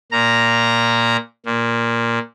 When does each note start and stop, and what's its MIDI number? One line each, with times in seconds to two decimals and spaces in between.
0.12 1.17 46
0.12 1.17 82
1.46 2.19 46